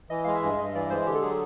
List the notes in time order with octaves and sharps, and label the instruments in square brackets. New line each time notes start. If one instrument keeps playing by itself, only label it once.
[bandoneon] E3 [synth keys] D#5
[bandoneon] G#3 [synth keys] F5
[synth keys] E5
[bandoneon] G2
[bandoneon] G2 [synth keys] D#5
[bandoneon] E3 [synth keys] D5
[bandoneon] G#3 [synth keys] C5
[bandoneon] D3 [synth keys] G4
[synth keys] A4
[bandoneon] F#3 [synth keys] G#4